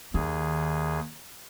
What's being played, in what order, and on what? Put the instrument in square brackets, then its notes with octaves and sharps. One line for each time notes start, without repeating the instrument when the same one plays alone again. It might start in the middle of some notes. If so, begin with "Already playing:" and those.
[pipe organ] D#2 G#4 [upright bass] D#3